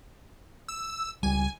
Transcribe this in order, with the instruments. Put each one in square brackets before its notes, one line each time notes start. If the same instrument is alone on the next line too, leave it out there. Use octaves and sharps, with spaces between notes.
[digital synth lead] E6
[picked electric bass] C#2 G3 [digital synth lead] G#5